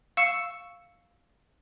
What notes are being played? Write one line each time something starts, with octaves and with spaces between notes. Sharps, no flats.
F5 C#6 E6 C#7 E7